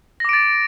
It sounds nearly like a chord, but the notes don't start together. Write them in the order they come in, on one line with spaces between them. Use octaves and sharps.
A#6 D6 D7 A6